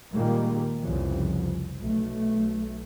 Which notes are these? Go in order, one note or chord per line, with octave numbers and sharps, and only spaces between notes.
A#2 D#3 G3 G#3 A#3
C2 F2 C#3 E3 F3
B1 A3